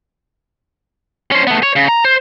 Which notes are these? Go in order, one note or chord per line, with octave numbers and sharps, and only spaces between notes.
C#4 C5
A3 B3
C#5
C#3
A#5
C5